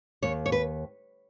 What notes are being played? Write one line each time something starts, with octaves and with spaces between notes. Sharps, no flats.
D#2 C#5
C#5
B4